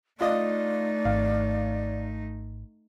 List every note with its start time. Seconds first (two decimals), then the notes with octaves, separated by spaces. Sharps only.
0.21 A3 D#4 F4 D5 D#5
1.05 G#1 F5